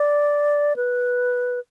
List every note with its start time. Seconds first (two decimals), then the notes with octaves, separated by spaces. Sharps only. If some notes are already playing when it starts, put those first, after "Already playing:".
Already playing: D5
0.76 B4